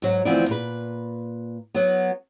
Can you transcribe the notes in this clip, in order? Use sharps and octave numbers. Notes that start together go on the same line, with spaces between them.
G#2 F#3
D2 E3 F3 B3 C4 D5
A#2 B4
F#3 B3